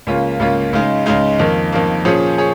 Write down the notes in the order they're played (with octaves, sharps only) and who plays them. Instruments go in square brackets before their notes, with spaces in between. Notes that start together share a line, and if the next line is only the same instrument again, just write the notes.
[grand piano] C#2 C#3 A#3 C#4 F4
C#2 C#3 A#3 C#4 F4
C#2 C#3 G#3 D#4
C#2 C#3 G#3 D#4
F2 D#3 A#3
F2 D#3 A#3
A#2 F3 C#4 G#4 C#5
G#4 C#5